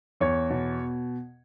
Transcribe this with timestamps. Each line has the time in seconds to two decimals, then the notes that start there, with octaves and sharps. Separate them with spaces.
0.20 E2 C#5
0.50 B2